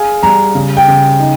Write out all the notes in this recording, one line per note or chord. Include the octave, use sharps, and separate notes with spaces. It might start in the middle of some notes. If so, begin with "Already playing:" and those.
Already playing: G#4 F5 G#5
G3 A#5
C#3
G5
C#3
D#4